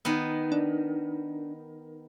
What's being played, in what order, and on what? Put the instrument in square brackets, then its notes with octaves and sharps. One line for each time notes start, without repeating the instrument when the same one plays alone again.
[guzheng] D#3 B3
[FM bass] D4